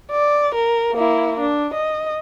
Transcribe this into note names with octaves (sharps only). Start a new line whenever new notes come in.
D5
A#4
A#3 E4
D4
D#5